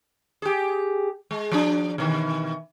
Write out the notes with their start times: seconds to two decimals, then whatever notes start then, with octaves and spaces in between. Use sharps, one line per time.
0.42 G4 G#4
1.31 G#3
1.52 F3 D4
1.98 B2 D#3 E3